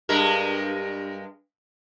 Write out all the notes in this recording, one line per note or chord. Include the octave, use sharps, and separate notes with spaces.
G2 G#3 A#4